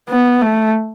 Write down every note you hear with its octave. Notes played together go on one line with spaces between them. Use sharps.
B3
A3